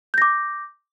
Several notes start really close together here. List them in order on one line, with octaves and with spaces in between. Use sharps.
G6 A#6 D6